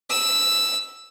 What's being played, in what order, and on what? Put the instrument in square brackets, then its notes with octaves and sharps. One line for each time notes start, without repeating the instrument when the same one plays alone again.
[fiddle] E6